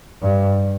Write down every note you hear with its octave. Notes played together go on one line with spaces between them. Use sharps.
G2